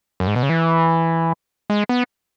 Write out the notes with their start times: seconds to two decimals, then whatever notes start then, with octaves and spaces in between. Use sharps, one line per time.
0.20 F#2
0.27 G#2
0.36 B2
0.43 C#3
0.49 E3
1.70 G#3
1.89 B3